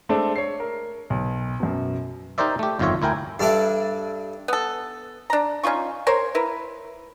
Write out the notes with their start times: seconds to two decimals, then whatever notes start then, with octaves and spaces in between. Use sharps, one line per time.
0.09 G#3 A3 C4 D4
0.36 C#5 C7
0.60 A#4
1.10 B1
1.60 F#2 B2
2.38 D#4 G4 A#4 C5 D5 E5
2.59 A3 G4
2.79 G1 F2 D#3 F4 C#5 E5
3.02 D2 E4 A#4 G5 G#5
3.40 G2 G3 D4 A4 E5
4.48 B3 A4
5.30 D4 A#5
5.63 C#4 D#4 F4 C#6
6.07 A#4 C5 C#5
6.35 E4 A#4 B4